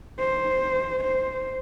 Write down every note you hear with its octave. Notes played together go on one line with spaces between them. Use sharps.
C5
C5